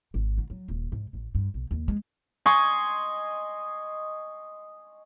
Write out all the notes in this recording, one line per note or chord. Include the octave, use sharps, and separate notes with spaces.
G#1
D3
F#3
D#1
G#2
A1
G2
B1
D#2
G#3
D#5 G#5 C6 C#6